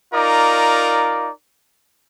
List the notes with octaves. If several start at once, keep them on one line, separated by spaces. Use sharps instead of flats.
D#4 F4 A#4 D5 D6